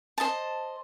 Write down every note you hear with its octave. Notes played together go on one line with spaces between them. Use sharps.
C5 D#5 A5